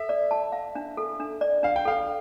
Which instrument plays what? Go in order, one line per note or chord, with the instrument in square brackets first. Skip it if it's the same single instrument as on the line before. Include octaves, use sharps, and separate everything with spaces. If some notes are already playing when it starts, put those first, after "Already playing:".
Already playing: [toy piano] A4 [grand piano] E5
[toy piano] D5
A5
F5
D4
A4
D4
D5
[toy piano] D4 [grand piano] F5
[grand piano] G5
[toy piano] A4 [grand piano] F5